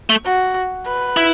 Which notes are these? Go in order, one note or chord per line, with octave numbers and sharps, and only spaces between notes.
A3
F#4
B4
E4